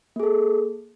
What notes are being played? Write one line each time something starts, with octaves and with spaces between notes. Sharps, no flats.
A#3 G#4 A4